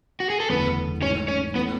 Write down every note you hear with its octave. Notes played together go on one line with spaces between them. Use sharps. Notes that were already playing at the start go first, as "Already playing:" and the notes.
F#4
G#4
A4
F#1 E2 D3 A3 B3 B4
G#2 E3 A3 C#4 E4 C#5
C#4 C#5
E3 A3 B3 C#4 B4